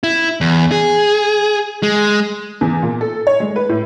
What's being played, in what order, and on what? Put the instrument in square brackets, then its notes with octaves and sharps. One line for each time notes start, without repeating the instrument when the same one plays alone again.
[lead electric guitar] E4
E2
G#4
G#3
[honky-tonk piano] E2
A#2
A4
C#5
G#3
B4
A2